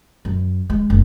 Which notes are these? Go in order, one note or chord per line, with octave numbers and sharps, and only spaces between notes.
F#2
G#3
F#1